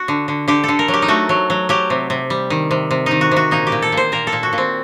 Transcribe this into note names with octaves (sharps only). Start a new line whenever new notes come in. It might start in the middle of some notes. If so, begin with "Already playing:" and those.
Already playing: F#4
D3
D3
D3 G4
D3 A4
A#4
F#3
G4
D#4
A3 F#4
F#3
F#3
F#3 G4
C3
C3
G3
D#3
C3
C3
D#3 D#4
F#4
C3
F#4
A#2 D#4
G4
A#2
A4
A#2
C5
A#2 A#4
A4
A#2
F#4
A#2
C4